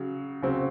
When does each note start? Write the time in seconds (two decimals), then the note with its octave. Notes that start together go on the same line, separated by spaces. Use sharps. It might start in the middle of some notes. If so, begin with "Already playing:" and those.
Already playing: C#3 F#3
0.42 C#3 F#3 C4